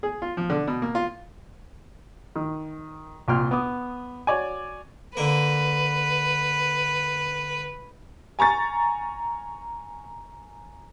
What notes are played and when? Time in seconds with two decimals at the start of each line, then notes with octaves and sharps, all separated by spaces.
0.03 G#4
0.22 F4
0.37 F3
0.50 D3
0.67 B2
0.82 A#3
0.95 F4
2.36 D#3
3.28 C2 A#2 G5 C6 F6
3.51 B3 D6 D#6
4.27 F#4 C#5 D5 G#5
5.17 D3 A#3 B4
8.39 G#5 A#5 C#6 A6